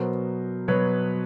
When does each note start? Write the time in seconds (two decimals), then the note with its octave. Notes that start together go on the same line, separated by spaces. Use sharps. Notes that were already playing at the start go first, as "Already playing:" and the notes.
Already playing: B2 F#3 B3 A#4 C5
0.68 B2 F#3 B3 B4 C#5